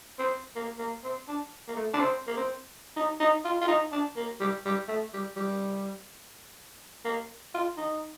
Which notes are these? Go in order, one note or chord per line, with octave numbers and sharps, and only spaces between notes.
C4
A#3
A#3
C4
D4
A#3
A3
D4
C4
A#3
C4
D#4
D#4
F4
F4
D#4
D4
A#3
G3
G3
A3
G3
G3
A#3
F4
D#4